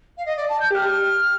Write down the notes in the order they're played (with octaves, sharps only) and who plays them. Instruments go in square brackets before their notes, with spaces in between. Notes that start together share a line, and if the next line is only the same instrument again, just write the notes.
[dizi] F5
D#5
D5
A5
G6
[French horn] G4 [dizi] G6
[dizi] F6